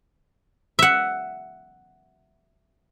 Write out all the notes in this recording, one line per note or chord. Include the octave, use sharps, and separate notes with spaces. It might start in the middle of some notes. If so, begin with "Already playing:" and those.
E5 F#5